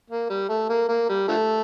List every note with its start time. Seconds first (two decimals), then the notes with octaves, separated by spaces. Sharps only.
0.10 A#3
0.30 G3
0.49 A3
0.69 A#3
0.89 A#3
1.09 G3
1.28 D3 F3 A3